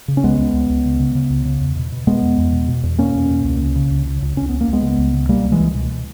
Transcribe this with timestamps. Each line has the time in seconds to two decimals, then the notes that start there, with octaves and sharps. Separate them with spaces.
0.08 C#3
0.17 C#4
0.23 C#2 G#3 B3
0.39 C#2
0.53 C#2
0.70 C#2
0.85 C#3
1.00 C#3
1.15 C#3
1.30 C#2
1.45 C#3
1.61 E2
1.77 B2
1.92 B2
2.07 B2 G#3 B3
2.22 E2
2.38 E2
2.53 B2
2.68 B2
2.83 E2
2.98 B2 A#3 C#4
3.15 E2
3.30 B2
3.45 C#2
3.60 C#3
3.76 C#3
3.91 C#2
4.06 C#3
4.22 C#2
4.36 C#2 C#4
4.49 C#2 B3
4.61 A#3
4.68 C#2
4.73 G#3 B3
4.82 C#3
4.98 C#2
5.14 C#3
5.29 B2 G3 A#3
5.45 C#2
5.52 E3 G#3
5.60 C#2
5.74 B2